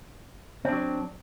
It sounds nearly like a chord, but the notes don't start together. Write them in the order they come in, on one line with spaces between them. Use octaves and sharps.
C4 D4 F#3